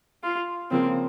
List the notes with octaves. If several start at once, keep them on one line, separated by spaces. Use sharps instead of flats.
F4
C#3 F3 A#3 C4